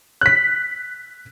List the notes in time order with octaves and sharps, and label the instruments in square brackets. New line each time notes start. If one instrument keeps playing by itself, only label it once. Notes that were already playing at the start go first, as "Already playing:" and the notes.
[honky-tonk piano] F#6 B6